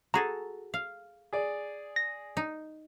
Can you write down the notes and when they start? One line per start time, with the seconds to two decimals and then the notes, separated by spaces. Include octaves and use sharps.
0.14 F#4 G#4 A4 A#5
0.74 F5
1.33 G#4 D5
1.96 A#6
2.37 D#4